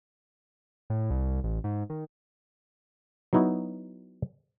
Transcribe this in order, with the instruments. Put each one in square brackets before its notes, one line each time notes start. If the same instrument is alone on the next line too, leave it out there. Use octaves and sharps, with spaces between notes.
[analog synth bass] A2
C2
A1
G#2
D#3
[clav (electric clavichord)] F#3 B3 D#4 E4 F#4